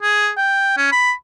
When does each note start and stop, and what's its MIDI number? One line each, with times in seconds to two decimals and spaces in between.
0.03 0.30 68
0.37 0.75 79
0.77 0.90 61
0.92 1.12 83